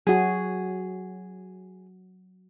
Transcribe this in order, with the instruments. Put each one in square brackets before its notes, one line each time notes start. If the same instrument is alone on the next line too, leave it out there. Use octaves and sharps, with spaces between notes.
[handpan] F#3 F#4 [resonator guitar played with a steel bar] G#4